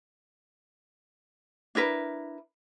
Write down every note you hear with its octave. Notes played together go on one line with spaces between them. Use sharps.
D4 E4 A#4 B4